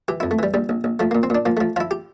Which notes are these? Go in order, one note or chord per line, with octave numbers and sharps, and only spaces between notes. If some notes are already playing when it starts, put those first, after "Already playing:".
E3 G4
F2 E4
A3
E3 G3
A#1 G3
A#1
A#1
F3 A3
A#2 A#3
C4
A#2 D4
F3 A#3
F3 A3
F3 E4 F4
G4